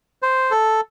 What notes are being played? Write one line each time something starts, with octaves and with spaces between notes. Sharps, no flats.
C5
A4